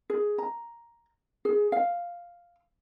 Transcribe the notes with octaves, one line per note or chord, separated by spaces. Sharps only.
G#4
A#5
G#4
F5